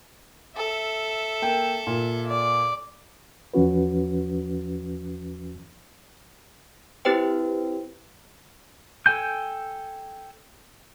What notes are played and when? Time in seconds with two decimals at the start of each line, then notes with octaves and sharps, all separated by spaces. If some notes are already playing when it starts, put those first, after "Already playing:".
0.57 A4 E5
1.42 A#3 G5
1.87 A#2
2.27 D5
3.54 E2 F3 C#4 F#4 B4
7.05 C4 E4 G4 B4 C5 G5
9.06 A4 G5 G#5 G6